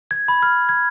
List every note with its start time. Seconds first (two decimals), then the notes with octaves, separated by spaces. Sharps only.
0.11 G#6
0.28 B5
0.43 F6
0.69 G#6